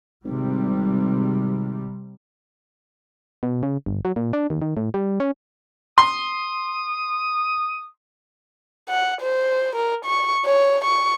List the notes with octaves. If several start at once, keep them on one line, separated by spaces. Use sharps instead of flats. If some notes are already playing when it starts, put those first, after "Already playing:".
G#1 C3 G3
B2
C#3
G1
F#3
A#2
D4
D#2
D#3
A2
G3
C#4
C6 D#6
F#5
C5
A#4
C#6
C#5
C#6